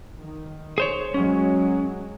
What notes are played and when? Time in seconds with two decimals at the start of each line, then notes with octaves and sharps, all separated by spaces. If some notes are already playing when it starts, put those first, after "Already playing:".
0.18 D#3
0.78 G#4 C5 C#5
1.14 F#3 G#3 C#4